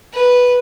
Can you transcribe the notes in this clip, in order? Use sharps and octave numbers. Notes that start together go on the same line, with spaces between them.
B4